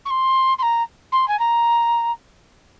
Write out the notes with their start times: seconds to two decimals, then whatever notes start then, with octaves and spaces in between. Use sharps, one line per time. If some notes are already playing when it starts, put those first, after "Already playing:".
0.05 C#6
0.10 C6
0.59 C6
0.62 A#5
1.12 C6
1.28 G#5
1.39 A#5